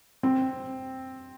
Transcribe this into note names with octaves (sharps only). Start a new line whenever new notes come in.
C4